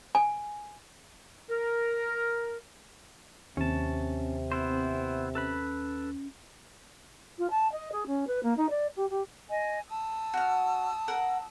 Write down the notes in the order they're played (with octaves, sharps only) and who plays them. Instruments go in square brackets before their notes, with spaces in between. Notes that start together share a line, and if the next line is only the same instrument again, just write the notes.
[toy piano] G#5
[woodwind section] A#4
[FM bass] D#2 [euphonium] C3 [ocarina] C4 [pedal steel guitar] C#4 A5
[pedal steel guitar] B3 E4 C5
[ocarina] C#4 [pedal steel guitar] A4 B4 B5
[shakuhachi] F4
A5
D#5
G#4
C#4
B4
A#3
D#4
D5
G4
G4
[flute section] D#5 G#5
A5 D#6 E6
[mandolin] F#4 F6
A#4 F#5